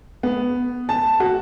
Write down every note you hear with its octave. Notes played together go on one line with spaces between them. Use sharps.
B3
A5
F#4